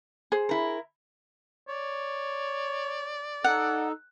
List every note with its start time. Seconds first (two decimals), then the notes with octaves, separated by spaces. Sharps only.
0.32 G#4 C5
0.49 E4 A#4
1.68 C#5 D5
3.44 D#4 A4 F#5